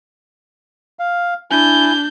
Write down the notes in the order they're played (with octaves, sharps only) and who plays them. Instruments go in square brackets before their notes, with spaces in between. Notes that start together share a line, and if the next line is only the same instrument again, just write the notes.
[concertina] F5
[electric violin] D4 G6 [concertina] E4 G#5